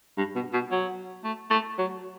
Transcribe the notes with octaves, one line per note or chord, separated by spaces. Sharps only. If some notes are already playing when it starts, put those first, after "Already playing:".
G2
B2
B2
F#3
A3
A3
F#3